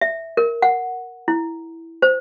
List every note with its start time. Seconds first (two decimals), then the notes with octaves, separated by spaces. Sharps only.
0.01 E5
0.37 A#4
0.62 F#5
1.28 E4
2.02 C5